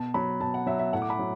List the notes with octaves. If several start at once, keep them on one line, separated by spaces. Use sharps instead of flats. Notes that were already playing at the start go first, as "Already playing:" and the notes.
Already playing: B2 A5
F#3 B5
B2 A5
F#5
F#3 E5
E5
A2 F#5
D6
B5
F#3